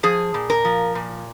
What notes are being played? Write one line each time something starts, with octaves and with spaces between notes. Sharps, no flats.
F3 G#4
A#2
A#4
F3
A#2